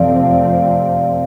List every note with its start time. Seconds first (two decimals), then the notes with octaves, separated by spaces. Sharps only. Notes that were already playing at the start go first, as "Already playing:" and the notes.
Already playing: F2 C3 F3 A3 C4 D5 F5